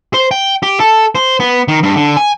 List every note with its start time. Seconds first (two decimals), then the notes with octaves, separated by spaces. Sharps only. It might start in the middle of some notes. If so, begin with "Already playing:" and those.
0.14 C5
0.31 G5
0.63 G4
0.80 A4
1.15 C5
1.40 B3
1.68 D#3
1.83 G2
1.96 D3
2.17 G#5